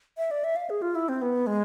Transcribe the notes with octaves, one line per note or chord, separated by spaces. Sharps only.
E5
D5
E5
F5
G#4
F4
E4
C4
B3
G#3